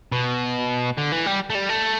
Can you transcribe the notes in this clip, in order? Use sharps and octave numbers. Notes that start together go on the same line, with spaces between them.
B2
D3
E3
G3
A3
G3
A3